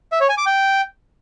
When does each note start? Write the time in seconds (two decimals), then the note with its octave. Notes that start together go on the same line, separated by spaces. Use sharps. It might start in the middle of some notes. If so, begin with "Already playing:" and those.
0.12 E5
0.21 C#5
0.29 G#5
0.38 D6
0.46 G5